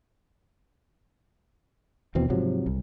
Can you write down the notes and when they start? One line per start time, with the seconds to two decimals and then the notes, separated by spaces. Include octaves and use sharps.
2.15 D#2 B2 E3 C4
2.30 G#2 C3 F3 F#3
2.66 C2